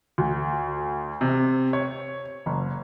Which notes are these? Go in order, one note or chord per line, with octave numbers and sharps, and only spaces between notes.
D2
C3
C#5
F#1